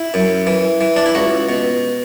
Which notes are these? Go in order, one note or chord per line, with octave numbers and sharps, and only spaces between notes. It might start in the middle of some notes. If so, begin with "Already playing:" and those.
Already playing: E4
F#2
E3
E3
D4
E4
C#2 F#4
B2